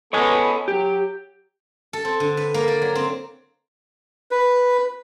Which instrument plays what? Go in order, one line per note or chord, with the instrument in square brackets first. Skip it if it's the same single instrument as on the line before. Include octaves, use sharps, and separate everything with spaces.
[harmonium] B3 A4 [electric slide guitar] C#5 D#5 G#5
[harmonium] F#3 [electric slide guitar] G4
[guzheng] A4
C4
D3
B4
A#3
D5
F#3
C4
[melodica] B4